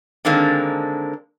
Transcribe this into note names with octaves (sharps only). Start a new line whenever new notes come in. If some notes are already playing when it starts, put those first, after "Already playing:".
D3 D#3 G#3 A#3 C4 D4